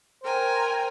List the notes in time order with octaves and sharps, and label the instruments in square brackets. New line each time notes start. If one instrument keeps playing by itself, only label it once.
[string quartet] A#4 G5 G#5 [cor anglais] C5